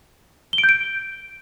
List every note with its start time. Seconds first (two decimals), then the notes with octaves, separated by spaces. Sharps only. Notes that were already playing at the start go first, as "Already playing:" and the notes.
0.53 G7
0.58 D7
0.64 G6
0.69 D7